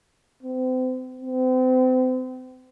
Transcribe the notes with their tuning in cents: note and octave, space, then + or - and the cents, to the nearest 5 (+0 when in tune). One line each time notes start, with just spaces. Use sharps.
C4 -35
C4 -35